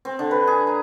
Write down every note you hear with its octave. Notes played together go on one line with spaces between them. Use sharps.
C4
D3
B4
G#4
A#5